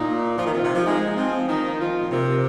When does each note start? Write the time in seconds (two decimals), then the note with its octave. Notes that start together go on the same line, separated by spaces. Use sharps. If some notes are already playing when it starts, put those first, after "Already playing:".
Already playing: A#2 D#4
0.38 F3
0.46 D#3
0.53 C3 F4
0.64 C3
0.74 F3
0.85 G#3 D#4
1.16 F3 C4
1.48 D#3 D#4
1.79 F3 F4
2.00 A#2
2.11 C3 A#4